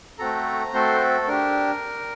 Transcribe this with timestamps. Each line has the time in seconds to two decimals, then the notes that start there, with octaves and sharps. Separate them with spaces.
0.19 A3 C4 F#4 A4 A#5
0.73 A3 C4 F#4 A4 C5
1.00 A4
1.28 D4 G4 A#4